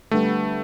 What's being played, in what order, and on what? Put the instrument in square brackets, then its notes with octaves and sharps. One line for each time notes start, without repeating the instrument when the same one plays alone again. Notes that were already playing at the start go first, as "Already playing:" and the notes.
[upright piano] D3 G3 B3 [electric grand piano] A3